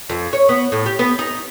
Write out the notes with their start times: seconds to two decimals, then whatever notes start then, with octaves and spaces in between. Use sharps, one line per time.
0.10 F2
0.33 C#5
0.49 B3
0.72 A2
0.86 G4
0.99 B3
1.19 D#4